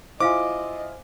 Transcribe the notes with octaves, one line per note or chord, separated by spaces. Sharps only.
E4 F4 C5 D#5 F5 G#5 D6